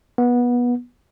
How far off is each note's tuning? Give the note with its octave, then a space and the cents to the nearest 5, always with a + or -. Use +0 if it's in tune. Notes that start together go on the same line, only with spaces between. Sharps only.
B3 -20